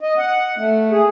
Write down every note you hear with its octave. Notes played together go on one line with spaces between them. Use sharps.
D#5
F#5
A3
G#4